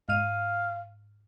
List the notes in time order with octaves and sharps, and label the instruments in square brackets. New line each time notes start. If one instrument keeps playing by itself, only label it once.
[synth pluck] G#2 F6 D#7 [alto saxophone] F5